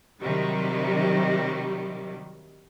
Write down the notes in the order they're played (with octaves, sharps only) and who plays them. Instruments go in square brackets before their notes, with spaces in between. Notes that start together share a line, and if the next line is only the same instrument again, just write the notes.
[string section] C3 D#3 F#3 G3